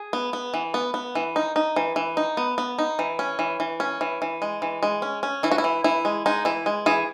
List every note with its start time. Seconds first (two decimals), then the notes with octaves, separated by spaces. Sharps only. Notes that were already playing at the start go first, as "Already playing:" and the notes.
Already playing: G#4
0.13 B3
0.33 B3
0.54 E3
0.74 B3
0.94 B3
1.15 E3
1.36 D#4
1.56 D#4
1.76 E3
1.96 E3
2.17 D#4
2.37 B3
2.58 B3
2.79 D#4
2.99 E3
3.19 C#4
3.39 E3
3.60 E3
3.80 C#4
4.01 E3
4.22 E3
4.42 G#3
4.62 E3
4.83 G#3
5.02 C#4
5.23 C#4
5.43 E3 E4
5.51 F#4
5.58 E4
5.64 E3
5.84 E3 E4
6.05 G#3
6.26 G#3 D#4
6.45 E3 E4
6.66 G#3
6.86 E3 G#4